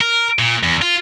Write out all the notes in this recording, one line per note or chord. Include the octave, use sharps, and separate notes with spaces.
A#4
A#2
E2
F4